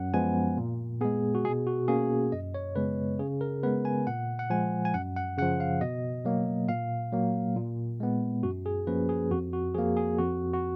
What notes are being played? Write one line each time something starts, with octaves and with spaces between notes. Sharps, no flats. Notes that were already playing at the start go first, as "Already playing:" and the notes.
Already playing: F#2 F#5
F3 G#3 B3 G#5
A#2
G#3 B3 G#4
F#4
B2 G#4
F#4
A#3 C#4 G#4
F#2 D#5
C#5
C#3 G#3 B3 B4
C#3 G#4
A#4
G#3 B3 B4
G#5
A#2 F#5
F#5
F3 G#3 G#5
G#5
F#2 F#5
F#5
C#3 F3 F#5
F5
B2 D#5
F#3 A#3
A#2 F5
F#3 A#3
A#2
G#3 B3
F#2 F#4
G#4
F3 A#3 C#4 B4
G#4
F2 F#4
F#4
F3 A#3 G#4
G#4
F2 F#4
F#4